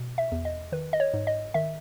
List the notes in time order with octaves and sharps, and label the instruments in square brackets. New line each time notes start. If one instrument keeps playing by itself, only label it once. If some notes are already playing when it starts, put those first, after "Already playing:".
Already playing: [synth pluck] B2
E5
E2
D#5
D#3 B4
D#5
C#5
G#2
D#5
D#3 E5